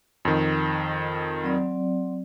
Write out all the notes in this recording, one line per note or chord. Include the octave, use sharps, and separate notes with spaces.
F2 D#3
F#3 C4 D5